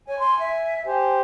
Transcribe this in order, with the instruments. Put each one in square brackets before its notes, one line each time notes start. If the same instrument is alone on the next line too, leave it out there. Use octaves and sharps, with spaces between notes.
[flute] C#5 [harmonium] G#5
[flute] C6
E5
[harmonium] G4 C5 [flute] G#5